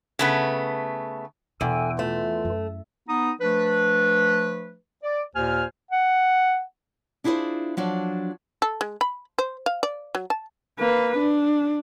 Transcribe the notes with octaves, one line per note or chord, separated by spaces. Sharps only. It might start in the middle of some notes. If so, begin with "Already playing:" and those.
C#3 A3 B3
E2 B2 D4 A4 G5 G#5
E3 A3 F4
F#2
B3 D#4 D#6
F3 A3 D4 B4
D5
D#2 A#2 C5 G#5 F6
F#5
D4 E4 F4 G#4 A4 C5
F3 F#3 D4
A4
G#3
B5
C5
F5
D5
F#3
A5
A#3 B4
D4